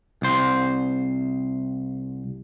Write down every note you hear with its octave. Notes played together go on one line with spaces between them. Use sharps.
C2 C5